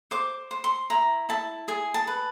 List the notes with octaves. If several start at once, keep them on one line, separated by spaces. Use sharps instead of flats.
C5 D6
C5
C6
E4 A#5
E4 A5
G#4 G#5
A5
B4